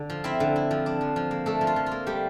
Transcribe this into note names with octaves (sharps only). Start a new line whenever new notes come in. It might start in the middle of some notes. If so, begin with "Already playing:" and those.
Already playing: D3
F3
C4 E4 E5
D3
E4
F3
D4
F3
F3
A#3
A3 D4 A4
F3
F4
F3
F4
A#3
G3 A3 G4